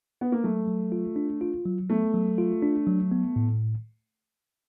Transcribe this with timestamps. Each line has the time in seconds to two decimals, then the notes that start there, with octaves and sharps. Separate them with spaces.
0.21 B3
0.32 A#3
0.44 F#3 A3
0.68 F#3
0.92 F4
1.16 D4
1.41 F4
1.65 F#3
1.90 A3 B3
2.14 F#3
2.38 F4
2.63 D4
2.87 F#3
3.11 B3
3.36 A2